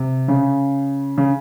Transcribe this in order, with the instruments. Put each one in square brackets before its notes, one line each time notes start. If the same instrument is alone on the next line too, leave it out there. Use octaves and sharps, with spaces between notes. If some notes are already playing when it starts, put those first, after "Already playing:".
Already playing: [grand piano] C3
C#3
C#3